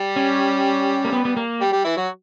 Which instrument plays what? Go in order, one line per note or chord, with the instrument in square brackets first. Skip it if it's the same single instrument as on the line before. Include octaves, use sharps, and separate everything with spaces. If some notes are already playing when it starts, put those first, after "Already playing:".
Already playing: [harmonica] G3 G4
[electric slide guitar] C#4
A#3
B3
B3
A#3
[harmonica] G3 G4
G3 G4
E3 E4
F#3 F#4